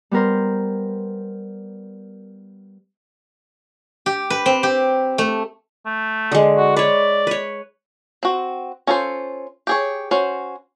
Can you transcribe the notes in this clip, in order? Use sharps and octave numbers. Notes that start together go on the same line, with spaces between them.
G3 B3 A#4 C5
G4
B4
C4
G4
A3
A3
D3 G#3
F#4
B4 C#5 D5
B4 C#5
C4 F#4
C#4 F4 A4 A#4 C5
G4 G#4 C#5
C#4 F#4 C5